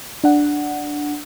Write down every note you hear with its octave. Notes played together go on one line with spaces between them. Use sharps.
D4 F#5